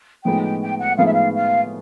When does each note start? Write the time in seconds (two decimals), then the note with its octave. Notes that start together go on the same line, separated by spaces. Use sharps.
0.25 A2 F3 G#3 B3 D#4 G5
0.43 G5
0.62 G5
0.80 F#5
0.98 A2 F3 G#3 B3 D#4 F5
1.06 E5
1.13 F5
1.35 F5